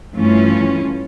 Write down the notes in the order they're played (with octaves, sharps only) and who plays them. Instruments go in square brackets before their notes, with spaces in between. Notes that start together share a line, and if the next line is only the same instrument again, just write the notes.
[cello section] G2 E3 A3 C#4 F4